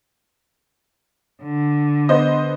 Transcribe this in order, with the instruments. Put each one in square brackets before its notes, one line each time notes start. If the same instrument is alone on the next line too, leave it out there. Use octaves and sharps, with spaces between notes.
[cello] D3
[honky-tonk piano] B3 C5 D#5